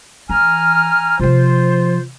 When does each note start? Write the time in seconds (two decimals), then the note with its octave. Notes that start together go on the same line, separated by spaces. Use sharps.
0.29 E3 G#5 A#5 F6
1.20 C3 F3 F4 C5